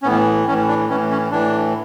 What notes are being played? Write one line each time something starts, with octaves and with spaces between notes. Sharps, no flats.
C#4
A2 E3 B3
A2 E3 C#4
D4
A2 E3 C#4
C#4
A2 E3 D4